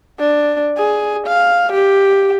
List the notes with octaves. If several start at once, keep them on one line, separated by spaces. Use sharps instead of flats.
D4
G#4
F5
G4